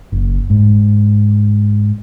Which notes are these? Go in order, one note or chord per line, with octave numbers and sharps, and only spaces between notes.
F#1
G#2